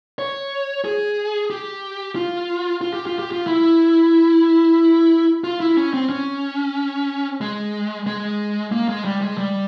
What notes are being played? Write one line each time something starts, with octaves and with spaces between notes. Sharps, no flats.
C#5
G#4
G4
F4
F4
G4
F4
G4
F4
E4
F4
E4
C#4
C4
C#4
G#3
G#3
A#3
G#3
G3
G#3
G3